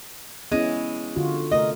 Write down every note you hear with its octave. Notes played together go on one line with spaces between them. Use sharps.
G#3 B3 C#4 E4
D3 F4 F#4
C3 A3 A#4 D#5